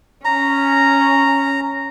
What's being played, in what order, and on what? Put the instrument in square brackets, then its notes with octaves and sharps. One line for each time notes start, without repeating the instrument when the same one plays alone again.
[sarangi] C#4 [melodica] A#5